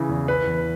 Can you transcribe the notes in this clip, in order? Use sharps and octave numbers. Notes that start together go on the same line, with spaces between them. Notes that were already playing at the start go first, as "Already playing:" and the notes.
Already playing: C#3 E3
E2
E3 B4
E2